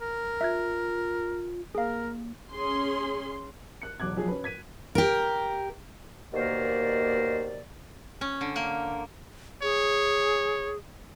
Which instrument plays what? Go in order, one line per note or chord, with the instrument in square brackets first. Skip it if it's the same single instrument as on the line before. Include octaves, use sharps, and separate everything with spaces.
[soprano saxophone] A#4
[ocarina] F4 [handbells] E5 F#6 G#6
[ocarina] A#3 [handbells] G#4 F5 [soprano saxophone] A#4
[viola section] C#4 G#4 C6
[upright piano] F#6 C#7
E1 B1 D6 F#6 G#6
B1 F3 G#4
C#4 B4
G#6 B6 D#7
[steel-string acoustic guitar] G4 A#4
[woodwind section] D#2 B2 A#3 A#4 C5 D5
[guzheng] C#4
D3
A#3
[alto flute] G#4 [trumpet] C#5